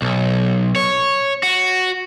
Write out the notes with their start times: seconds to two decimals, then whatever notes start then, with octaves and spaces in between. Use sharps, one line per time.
0.02 B1
0.76 C#5
1.43 F#4